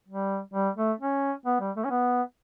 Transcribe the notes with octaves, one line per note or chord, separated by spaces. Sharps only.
G3
G3
A3
C#4
B3
G3
A3
C#4
B3